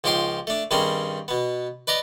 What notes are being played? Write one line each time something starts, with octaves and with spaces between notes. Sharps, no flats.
C#2 F3 D#4 G4 G5 C6
A3 D4
G2 D#3 G3 C4 C#4 G#4
B2 B3
B4 D5 D#5 A#5